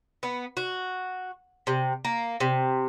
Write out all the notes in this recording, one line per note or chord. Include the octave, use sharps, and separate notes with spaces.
B3
F#4
C3
A#3
C3